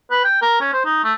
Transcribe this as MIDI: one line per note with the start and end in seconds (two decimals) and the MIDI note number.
0.11 0.20 71
0.24 0.37 79
0.42 0.59 70
0.61 0.71 61
0.73 0.83 72
0.85 1.00 63
1.04 1.14 57